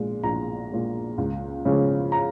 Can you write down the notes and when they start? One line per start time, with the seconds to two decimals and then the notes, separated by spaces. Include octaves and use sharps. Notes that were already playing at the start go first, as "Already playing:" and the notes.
Already playing: A#1 A#2 G#3
0.23 A#1 A#5
0.70 A#2 G#3
1.18 C#2
1.65 C#3 F3 G#3 C#4
2.12 A#5